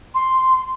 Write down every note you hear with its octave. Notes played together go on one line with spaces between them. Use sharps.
C6